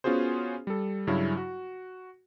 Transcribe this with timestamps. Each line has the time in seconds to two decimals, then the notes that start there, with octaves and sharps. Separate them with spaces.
0.04 B3 C#4 F4 F#4 G#4 C5
0.67 G3 A4
1.07 G2 C#3 F#3 C#4 E4
1.37 F#4